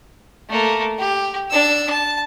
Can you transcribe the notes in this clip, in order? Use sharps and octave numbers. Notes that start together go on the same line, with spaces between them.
A3 A#3
G4
D4 E6
A5